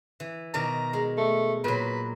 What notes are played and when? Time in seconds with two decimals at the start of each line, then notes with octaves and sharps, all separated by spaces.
0.20 E3
0.54 B2 D#3 D5 A#5
0.93 G#3
1.17 A3
1.64 A#2 F#3 B4